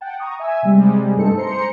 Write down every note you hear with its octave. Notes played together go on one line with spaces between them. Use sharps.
F#5 G5 A5
A#5 C#6 D#6
E5 G#5 E6
C3 G3 G#3
G2 A3 C4 D#4 A4 C#7
G#3 C5 A#5 C6 C#7